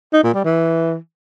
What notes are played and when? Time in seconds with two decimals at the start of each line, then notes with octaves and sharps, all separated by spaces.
0.13 D#4
0.24 A#2
0.34 G3
0.45 E3